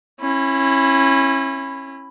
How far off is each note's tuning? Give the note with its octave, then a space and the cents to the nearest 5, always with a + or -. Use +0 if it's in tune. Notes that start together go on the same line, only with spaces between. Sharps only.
C#4 -30 E4 +5